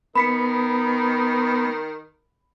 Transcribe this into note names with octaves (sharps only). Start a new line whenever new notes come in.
D#3 B3 B5 B6 C#7